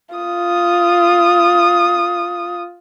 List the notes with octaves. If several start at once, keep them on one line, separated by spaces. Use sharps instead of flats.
F4 D#6